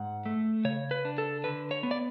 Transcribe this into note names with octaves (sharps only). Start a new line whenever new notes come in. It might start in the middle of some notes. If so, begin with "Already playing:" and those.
Already playing: G#2 F#5
A3
C#3 C#5
B4
D4
A4
D3 B4
C#5
B3
D5